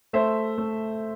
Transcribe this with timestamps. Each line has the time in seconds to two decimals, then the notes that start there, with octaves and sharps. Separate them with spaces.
0.13 A3 C5 E5
0.58 A3